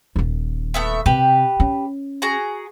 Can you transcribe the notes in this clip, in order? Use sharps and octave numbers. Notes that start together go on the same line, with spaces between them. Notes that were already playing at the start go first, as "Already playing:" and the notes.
D#1 D#3
A3 B3 E5
C3 G4 B4
C#4
F#4 G#4 A#5